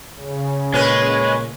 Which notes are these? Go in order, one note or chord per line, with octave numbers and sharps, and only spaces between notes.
C#3
A#2 G#3 C#4 B4